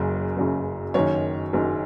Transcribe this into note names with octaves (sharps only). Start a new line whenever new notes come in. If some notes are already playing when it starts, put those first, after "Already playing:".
Already playing: F#1 F#2 C#3
F#1 F#2 C#3
F#1 F#2 D#3 C#5
F#1 F#2 D#3